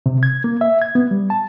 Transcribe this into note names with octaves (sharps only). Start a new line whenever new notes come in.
C3
G#6
A#3
E5
G#6
B3
G3
A5